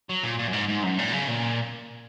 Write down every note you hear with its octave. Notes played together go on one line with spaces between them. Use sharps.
F#3
A#2
A#2
F#2
G#2
G#2
F#2
A#2
C#3
A#2